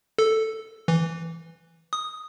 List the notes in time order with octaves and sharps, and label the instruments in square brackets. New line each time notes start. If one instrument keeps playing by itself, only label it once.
[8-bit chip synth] A4
E3
D#6